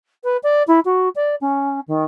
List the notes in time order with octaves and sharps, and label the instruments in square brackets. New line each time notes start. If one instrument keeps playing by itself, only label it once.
[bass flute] B4
D5
E4
F#4
D5
C#4
D#3